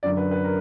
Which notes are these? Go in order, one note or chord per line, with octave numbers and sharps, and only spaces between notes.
F#2 D3 F#3 D5
B4
B4
A#4